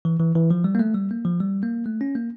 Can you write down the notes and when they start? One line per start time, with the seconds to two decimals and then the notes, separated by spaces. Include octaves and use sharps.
0.05 E3
0.19 E3
0.35 E3
0.51 F3
0.64 G3
0.75 A#3
0.79 A3
0.94 G3
1.11 A#3
1.25 F3
1.40 G3
1.63 A#3
1.86 A3
2.01 C#4
2.15 A#3